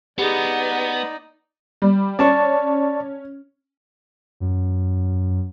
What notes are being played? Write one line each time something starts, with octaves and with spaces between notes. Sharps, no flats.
B3 D#4 G4 G#4 D5
G3
C#4 D5 A5 C#6
F#2